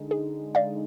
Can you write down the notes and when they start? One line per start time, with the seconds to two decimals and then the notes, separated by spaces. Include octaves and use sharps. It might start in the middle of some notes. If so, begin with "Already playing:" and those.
Already playing: D3 G#3 D#4
0.11 G#4
0.55 D5 F5